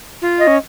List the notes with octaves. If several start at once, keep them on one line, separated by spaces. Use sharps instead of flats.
F4
D#5
C#4